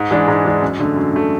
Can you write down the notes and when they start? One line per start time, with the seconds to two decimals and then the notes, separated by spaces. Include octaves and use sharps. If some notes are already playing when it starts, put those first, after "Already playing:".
Already playing: G#2
0.11 E3 G#3 D4
0.28 G#2
0.45 E3 G#3 D4
0.61 F#2
0.79 D3 A3
0.96 F#2
1.14 D3 A3